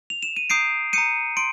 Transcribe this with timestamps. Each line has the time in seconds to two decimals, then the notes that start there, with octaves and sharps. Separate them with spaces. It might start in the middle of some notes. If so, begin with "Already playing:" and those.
0.10 F7
0.23 E7
0.37 D#7
0.50 A#5 D#6 G6 C7 D7
0.93 A#5 D#6 G6 C#7 D#7
1.37 C6 D7